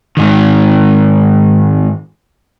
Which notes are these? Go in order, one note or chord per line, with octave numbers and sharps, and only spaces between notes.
G#2 D#3